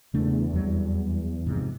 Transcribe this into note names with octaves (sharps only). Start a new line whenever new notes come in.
E2 C#3 A3 D4
F2 F#3 G3
G#2 C3 F3